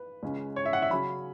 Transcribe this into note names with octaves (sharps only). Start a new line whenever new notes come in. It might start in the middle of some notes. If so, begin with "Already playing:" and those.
Already playing: B4
C#2 C#3 G#3 C#4
C#5
E5
F#5
E5
C#3 F#3 C#4 B5